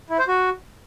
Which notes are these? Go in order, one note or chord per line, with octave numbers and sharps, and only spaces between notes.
E4
C5
F#4